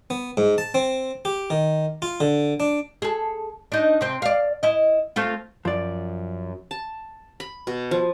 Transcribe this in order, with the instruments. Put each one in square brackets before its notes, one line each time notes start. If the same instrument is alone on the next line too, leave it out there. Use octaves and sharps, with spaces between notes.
[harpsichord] B3
G#2
A5
C4
G4
D#3
F4
D3
D4
[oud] G#4 A4
D4 D#4
C3 C4
D5 F5
E4 D#5
A3 C4 F4
[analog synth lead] F#2 [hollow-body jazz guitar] F3 D5
[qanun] A5
B5
B2
F3